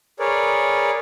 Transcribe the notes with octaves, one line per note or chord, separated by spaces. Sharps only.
G#4 A#4 B4 C#5 D5